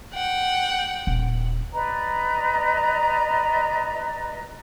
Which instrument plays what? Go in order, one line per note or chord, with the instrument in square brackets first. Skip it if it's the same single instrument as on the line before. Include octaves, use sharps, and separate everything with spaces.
[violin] F#5 G5
[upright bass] D#1
[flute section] B4 D5 D#5 A#5